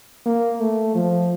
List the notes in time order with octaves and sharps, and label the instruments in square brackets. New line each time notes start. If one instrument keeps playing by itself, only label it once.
[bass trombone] A#3
A3
F3